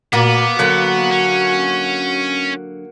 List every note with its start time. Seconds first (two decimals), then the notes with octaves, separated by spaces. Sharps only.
0.13 A#2 A#3 B3 F#4
0.59 D3 F#3 A#3 F#4 F#5
1.12 C#4